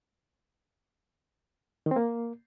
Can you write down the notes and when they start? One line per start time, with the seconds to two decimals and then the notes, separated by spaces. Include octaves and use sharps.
1.86 D#3
1.91 C4
1.96 A#3